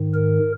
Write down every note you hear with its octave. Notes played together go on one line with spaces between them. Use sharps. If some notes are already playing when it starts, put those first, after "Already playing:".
Already playing: G#2 D#3
A#4